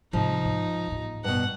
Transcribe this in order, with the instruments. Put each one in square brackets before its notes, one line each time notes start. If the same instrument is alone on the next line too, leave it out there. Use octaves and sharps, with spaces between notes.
[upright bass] G#2 C3 [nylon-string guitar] F3 [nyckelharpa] D#4
[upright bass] G#2
A1 D#2
[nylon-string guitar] G2 B2 [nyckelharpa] F#5